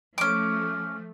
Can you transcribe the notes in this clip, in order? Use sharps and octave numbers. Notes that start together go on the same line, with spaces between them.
F3 A3 C#4 D6